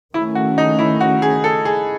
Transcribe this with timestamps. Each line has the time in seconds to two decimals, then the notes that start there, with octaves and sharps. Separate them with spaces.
0.14 D#3 A3 C#4 E4
0.35 F#4
0.58 D#4
0.79 E4
1.00 F#4
1.22 G#4
1.44 A4
1.65 G#4